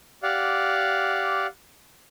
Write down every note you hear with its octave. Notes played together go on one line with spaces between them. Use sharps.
G4 D5 F5 F#5